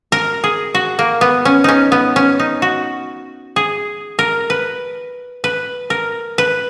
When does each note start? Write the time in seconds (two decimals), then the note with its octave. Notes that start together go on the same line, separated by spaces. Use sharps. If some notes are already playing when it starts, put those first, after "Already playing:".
0.12 A#4
0.44 G#4
0.75 F#4
0.99 A#3
1.21 B3
1.45 C#4
1.64 C#4 D#4
1.92 B3
2.16 C#4
2.39 D#4
2.62 F#4
3.56 G#4
4.19 A#4
4.50 B4
5.44 B4
5.90 A#4
6.38 B4